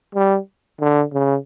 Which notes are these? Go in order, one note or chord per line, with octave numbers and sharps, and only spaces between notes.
G3
D3
C#3